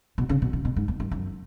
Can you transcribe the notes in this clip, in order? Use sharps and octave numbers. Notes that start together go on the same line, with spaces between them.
B2
C#3
B2
B2
B2
G#2
E2
F#2
F#2